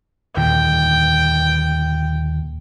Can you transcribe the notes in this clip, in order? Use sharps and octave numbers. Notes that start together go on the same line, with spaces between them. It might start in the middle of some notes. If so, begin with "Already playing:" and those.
D#2 A#2 D3 G5